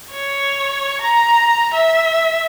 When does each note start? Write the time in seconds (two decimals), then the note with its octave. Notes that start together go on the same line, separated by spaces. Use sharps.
0.11 C#5
1.01 A#5
1.73 E5